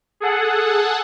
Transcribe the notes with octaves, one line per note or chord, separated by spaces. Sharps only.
G#4 A4 F#5